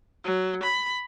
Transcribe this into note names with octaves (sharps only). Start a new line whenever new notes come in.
F#3
B5